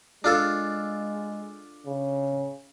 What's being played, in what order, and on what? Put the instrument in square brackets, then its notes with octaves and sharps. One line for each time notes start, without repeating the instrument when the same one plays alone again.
[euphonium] G#3 [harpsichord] D4 F4 A4
[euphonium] C#3